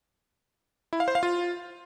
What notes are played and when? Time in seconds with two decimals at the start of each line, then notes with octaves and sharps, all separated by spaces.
0.93 E4
1.00 F5
1.08 C5
1.15 F5
1.23 F4